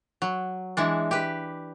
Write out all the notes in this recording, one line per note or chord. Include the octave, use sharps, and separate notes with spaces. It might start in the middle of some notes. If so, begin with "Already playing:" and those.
F#3
E3 G#3 D4
G4 B4